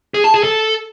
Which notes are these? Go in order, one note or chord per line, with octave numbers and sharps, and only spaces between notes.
G#4
A5
G#4
A4